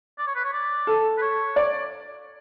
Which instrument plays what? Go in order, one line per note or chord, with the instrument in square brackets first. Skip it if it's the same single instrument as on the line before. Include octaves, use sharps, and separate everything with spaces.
[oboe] D5
C#5
B4
C#5
D5
[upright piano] A4
[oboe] B4
C#5
[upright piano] D5